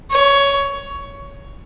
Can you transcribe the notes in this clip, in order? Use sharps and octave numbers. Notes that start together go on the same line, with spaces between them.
C#5